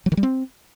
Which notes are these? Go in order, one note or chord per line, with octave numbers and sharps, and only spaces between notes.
F#3
D#3
G3
C4